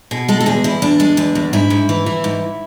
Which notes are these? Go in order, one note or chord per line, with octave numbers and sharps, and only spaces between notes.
B2 G#4
G#3 A4
A4
E2 G#4
E2 E4
E2 D4
G#3
E2
E2
G#2 E4
G#2
E3
E3
G#2